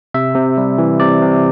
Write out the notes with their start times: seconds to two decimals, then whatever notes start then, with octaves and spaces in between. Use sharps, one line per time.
0.14 C3 E5
0.35 C3
0.58 G3
0.78 E3
1.00 C3 D5
1.22 C3